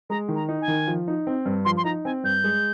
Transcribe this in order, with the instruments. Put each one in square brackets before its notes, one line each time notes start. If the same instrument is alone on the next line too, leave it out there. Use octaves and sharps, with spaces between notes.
[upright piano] G#3 [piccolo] A#5
[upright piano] D#3
[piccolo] A#5
[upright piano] D#4
[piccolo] G#5
[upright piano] D#3
F3
D#4
C4
G2
[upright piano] F3 [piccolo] C6
[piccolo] C6
[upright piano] D#4 [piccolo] A#5
[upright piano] C4 [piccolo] G#5
[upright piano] G2 [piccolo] G6
[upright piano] G#3